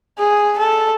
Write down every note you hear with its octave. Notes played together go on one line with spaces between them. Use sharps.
G#4
A4